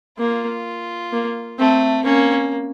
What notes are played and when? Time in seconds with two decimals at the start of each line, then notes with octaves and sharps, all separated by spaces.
0.19 A#3 F4
1.13 A#3
1.59 A3 C4
2.05 A#3 C#4